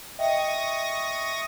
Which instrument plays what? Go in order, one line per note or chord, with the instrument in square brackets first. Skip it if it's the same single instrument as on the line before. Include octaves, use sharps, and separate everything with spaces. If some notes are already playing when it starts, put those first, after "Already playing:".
[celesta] D#5 E5 G5 [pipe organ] C#6 D#6 A#6